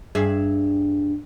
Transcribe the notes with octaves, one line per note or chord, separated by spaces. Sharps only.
G2 G#4 E5